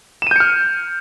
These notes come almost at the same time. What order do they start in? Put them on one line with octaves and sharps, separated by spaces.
E7 D#7 G6 C#7 F6